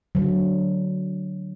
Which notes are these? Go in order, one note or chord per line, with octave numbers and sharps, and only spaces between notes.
D3 F#3